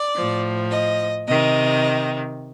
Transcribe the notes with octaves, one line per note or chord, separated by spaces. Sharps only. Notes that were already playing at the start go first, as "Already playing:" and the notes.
Already playing: D5
A2 F3
D#5
C3 D#3 D#5